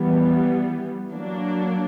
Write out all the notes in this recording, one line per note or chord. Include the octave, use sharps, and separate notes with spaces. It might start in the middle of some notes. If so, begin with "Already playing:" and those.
Already playing: E3 G3 B3
F#3 A#3 D4